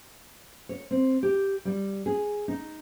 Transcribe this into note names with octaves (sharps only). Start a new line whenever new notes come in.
C#5
C4
G4
G3
G#4
D#4